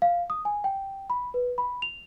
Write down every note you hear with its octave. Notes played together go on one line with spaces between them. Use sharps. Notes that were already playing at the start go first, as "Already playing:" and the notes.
F5
D#6
G#5
G5
B5
B4
B5
F7